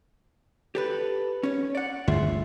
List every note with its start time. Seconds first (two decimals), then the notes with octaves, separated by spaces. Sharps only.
0.75 G4 A4 B4
1.43 C#4 C#5
1.75 D5 F#5
2.08 G1 D2 F4 G#4 E5